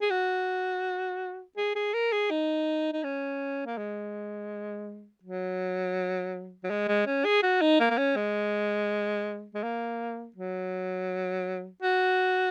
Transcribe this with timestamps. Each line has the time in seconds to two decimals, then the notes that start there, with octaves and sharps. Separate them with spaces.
0.01 G#4
0.10 F#4
1.57 G#4
1.75 G#4
1.94 A#4
2.12 G#4
2.30 D#4
2.93 D#4
3.03 C#4
3.66 A#3
3.77 G#3
5.23 F#3
6.64 F#3
6.70 G#3
6.88 G#3
7.06 C#4
7.25 G#4
7.43 F#4
7.61 D#4
7.80 A#3
7.90 A#3
7.98 C#4
8.16 G#3
9.55 G#3
9.63 A#3
10.36 F#3
11.82 F#4